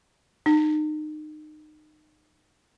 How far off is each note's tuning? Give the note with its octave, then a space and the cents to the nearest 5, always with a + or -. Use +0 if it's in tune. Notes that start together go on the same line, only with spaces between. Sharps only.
D#4 -30